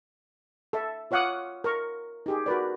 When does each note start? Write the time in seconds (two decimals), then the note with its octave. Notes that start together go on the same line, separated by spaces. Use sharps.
0.73 A4 E5
1.11 F4 C#5 F5 F#5 D6 D#6
1.64 A#4 A#5 C#6
2.26 D#4 G4 G#4
2.46 F#4 A#4 B4 D5